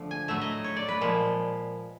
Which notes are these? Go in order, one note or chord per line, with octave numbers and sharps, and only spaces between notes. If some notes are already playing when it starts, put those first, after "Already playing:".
Already playing: D3 F3 A3
G#5
A2 F#3 A3 E5
D#5
C#5
D5
B4
A#2 F3 G#3